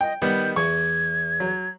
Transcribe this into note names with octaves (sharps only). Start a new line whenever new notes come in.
D#5 G5
D#3 G3 B3 G6
E2 C#6 G#6
F#3